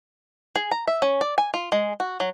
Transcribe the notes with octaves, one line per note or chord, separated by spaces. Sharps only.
G#4
A#5
E5
C#4
D5
G#5
F4
G#3
F#4
F#3